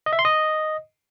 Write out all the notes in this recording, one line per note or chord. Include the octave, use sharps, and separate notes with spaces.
D#5
E5
C6
D#5